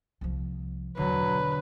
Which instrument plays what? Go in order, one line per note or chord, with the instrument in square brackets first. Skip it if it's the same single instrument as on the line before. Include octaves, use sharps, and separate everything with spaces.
[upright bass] C2 F3
[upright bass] E2 B2 [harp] D3 [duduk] F#3 [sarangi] B4